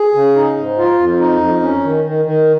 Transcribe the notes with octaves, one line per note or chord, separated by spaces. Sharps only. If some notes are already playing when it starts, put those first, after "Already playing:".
Already playing: G#4
C#3
D#4
G#2
F4
F2
D#4
F2
C#4
D#3
D#3
D#3